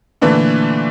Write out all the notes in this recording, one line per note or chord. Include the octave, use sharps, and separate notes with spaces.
A#2 D3 E3 A3